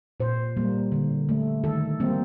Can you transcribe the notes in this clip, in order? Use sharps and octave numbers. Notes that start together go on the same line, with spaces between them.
A#2 C5
G3 A#3
D3
A3
D#3 A4
G3 A#3 C4